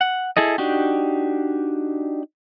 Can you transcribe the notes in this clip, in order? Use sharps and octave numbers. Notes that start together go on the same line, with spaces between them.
F#5
E4 G#4 A4 D#5
D4 D#4 F#4 G4